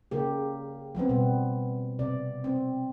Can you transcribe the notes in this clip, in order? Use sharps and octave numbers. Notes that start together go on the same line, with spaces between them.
C#3 A#3 G4
F3 G3 B3 C4
B2 B3
C3 D5
C4